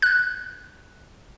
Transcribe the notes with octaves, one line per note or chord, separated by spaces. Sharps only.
F#6